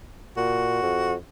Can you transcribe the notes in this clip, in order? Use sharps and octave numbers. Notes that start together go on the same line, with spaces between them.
A#2 F#4
F2